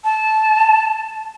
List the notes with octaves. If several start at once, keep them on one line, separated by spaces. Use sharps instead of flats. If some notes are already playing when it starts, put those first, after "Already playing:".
A5